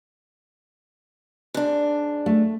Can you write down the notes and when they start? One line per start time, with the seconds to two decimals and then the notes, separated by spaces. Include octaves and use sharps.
1.54 G#2 D4
2.26 A3